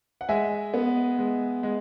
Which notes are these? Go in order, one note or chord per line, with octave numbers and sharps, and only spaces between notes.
F#5
G#3 E5 G#5
B3
G#3
G#3